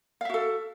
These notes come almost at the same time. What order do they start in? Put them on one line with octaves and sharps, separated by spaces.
F5 E5 F#4 A4